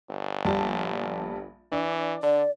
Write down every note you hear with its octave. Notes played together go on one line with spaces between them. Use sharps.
G1
A#1 G3 A5
E3 D4
D3 D5